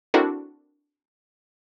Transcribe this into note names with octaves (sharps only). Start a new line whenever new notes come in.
C4 D4 E4 F#4 A4 A#4